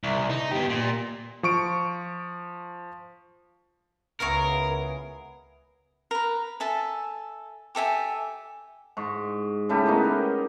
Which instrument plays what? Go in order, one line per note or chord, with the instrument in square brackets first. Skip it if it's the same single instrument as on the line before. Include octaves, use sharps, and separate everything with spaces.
[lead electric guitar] C2
D#4
B3 G4
A#2
[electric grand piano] F3 C#6 D7
[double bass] C#2 [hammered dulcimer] B3 E4 G#4 [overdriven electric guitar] A#4 [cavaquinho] F5 A#5 C#6
[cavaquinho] A#4 B4
A4 E5 G#5
G4 A4 E5 G#5
[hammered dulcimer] G#2 C#6
C#3 A3 E4 G4
A#3 B3 D#4
A#4